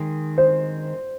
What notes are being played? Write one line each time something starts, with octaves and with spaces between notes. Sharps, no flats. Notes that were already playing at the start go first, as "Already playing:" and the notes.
Already playing: D#3 G#3 C4
C5